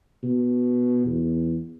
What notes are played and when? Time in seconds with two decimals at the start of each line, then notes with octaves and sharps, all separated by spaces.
0.23 B2
1.06 E2